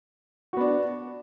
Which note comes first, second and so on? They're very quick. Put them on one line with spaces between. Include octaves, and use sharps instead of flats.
F#4 B3 D4